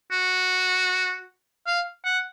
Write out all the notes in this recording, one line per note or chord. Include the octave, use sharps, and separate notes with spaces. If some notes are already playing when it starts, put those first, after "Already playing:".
F#4
F5
F#5